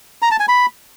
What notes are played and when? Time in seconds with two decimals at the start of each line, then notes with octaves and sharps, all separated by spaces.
0.22 A#5
0.31 A5
0.40 G#5
0.48 B5